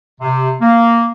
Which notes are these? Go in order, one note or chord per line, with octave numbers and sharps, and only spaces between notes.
C3
A#3